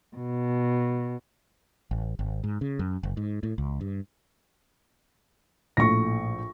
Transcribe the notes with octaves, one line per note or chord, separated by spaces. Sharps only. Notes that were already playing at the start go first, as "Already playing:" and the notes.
B2
A1
G#1
G#2
C#3
F#2
F#1
G#2
A2
C#2
G2
A#1 A2 C#6 A#6